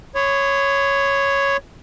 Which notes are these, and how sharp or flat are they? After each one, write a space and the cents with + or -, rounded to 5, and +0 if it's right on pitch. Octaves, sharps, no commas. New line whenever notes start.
C#5 +0 B5 +45 D#6 -35